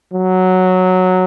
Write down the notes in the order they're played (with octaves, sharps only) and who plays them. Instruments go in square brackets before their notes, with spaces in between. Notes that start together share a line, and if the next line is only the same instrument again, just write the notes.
[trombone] F#3